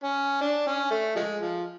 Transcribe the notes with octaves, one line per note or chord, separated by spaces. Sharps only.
C#4
D4
C#4
A3
F3 G#3
F3